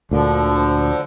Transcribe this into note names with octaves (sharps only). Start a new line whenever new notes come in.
D2 A#2 D3 F3